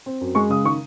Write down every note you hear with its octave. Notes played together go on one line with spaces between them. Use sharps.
C4
F#2
G#3 C#6
C#3 D#6
D#3 C#6